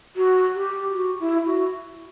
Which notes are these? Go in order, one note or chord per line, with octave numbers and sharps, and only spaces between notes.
F#4
G4
F#4
E4
F#4